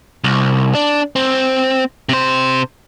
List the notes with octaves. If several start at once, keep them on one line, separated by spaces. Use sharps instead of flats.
C2
D4
C4
C3 C5